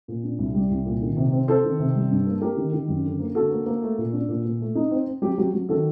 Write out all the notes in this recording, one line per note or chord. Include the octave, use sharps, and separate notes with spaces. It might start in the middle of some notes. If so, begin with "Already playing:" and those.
A#2
D4
C2
G3
C2
A#2
D#3
C3
C4
C4 A4 C5
D#3
C3
G3
G2
A#3
A#3 G4 A#4
D#3
D#3
F#2
D3
A#3
D3 F#4 A4
A#3
A#3
A3
A#2
D4
A#2
A#2
A3
D#4
C4
C4
F#3 G4
F#3 F#4
F#3
D#3 F#4 A4